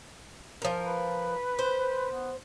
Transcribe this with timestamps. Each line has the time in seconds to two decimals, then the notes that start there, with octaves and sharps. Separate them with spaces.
0.62 F3 A#4
0.86 B4
1.59 C5
2.11 B3